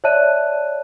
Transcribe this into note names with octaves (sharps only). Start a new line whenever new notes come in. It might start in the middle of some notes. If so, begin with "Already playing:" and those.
C#5 D5 E5 A5 F#6 D#7